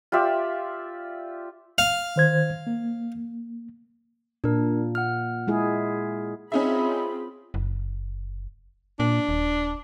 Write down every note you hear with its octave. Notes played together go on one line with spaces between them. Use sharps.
F4 G4 D5 E5
F5
D#3 C5 G#6
A#3
A#2 D4 A#4
F#5 F6
G#3 E4 G#4
C4 C#4 D#4 F4 G#4 E5 B5
F#1
A#2 D4
D#1